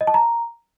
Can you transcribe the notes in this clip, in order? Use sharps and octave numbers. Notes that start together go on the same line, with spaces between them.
D#5
A5
A#5